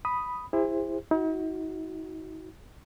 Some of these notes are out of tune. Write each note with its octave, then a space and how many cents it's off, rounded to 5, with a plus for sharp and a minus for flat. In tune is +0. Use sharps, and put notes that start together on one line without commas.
B5 +0 D#6 +0
E4 +5 G#4 -45 C5 +0
D#4 +45 F#4 +0